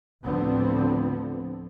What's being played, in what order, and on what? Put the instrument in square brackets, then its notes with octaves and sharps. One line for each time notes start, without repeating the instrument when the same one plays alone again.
[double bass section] D2 A2 D3 F3 B3 C4